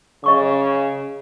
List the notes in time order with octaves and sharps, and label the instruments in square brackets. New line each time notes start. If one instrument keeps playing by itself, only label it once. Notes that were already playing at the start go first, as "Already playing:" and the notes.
[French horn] C#3 [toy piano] D#5 C#6 D6